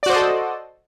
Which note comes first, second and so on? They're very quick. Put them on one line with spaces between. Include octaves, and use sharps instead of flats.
D5 F#4 C5 D#5 A4